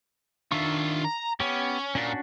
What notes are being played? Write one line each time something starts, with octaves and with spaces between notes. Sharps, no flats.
D#3 D4 F4 E5 C#6
A#5
B3 C#4 G4
A#2 C#4 D4 F#4